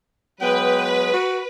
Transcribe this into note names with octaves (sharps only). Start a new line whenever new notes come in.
F#3 G#3 B3 B4 G5
F#4